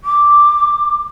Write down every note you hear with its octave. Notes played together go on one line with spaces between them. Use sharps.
D6